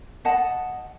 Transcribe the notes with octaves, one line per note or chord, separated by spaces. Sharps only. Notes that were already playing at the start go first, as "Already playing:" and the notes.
D#5 F#5 A5